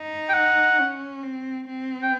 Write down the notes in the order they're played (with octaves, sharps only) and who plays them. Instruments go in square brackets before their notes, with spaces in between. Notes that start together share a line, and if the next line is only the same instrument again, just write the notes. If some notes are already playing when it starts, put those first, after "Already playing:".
Already playing: [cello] D#4
[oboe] G5
F#5
[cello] C#4
C4
C4
[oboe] G5